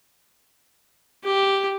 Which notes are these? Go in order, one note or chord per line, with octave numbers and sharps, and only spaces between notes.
G4